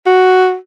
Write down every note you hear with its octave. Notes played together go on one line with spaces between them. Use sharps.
F#4